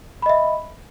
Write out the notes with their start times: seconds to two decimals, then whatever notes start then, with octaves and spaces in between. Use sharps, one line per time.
0.22 B5
0.26 D#5
0.29 E5